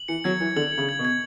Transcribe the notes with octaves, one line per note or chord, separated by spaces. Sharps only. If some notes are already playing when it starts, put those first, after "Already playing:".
Already playing: F#7
E3 C#7
F#3 G#6
E3 G#6
D3 F#7
C#7
C#3
G#6
B2
G#6